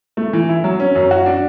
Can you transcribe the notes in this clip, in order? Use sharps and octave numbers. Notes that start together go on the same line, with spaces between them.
A3
E3
E4
F#3
C#4
F#2
F#4
D4